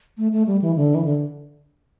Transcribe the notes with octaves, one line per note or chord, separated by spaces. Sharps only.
A3
A3
G3
E3
D3
E3
D3